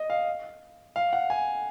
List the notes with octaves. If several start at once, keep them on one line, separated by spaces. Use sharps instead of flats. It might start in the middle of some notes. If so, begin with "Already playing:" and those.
Already playing: D#5
F5
F5
F#5
G#5